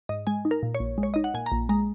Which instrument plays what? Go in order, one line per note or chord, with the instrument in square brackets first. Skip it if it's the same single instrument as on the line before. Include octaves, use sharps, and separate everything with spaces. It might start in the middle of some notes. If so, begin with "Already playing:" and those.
[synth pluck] G#2 D#5
G#3 G#5
D#4
A#4
A#2
C#5
A#1
G#3
C#5
D#4 D#5
F#5
A#2 G#5
A#5
A#1
G#3 A#5